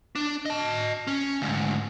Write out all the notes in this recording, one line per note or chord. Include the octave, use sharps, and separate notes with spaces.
D4
D#5 A5
C#4
D2 G#2